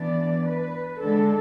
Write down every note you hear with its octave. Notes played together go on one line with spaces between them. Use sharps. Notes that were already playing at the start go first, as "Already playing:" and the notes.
Already playing: E3 B3 D4 D5
B4
D3 G#3 D4 A4